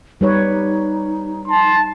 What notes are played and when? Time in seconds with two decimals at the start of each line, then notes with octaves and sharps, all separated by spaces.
0.21 G3 D#4 B4 C#5
1.47 A5 C6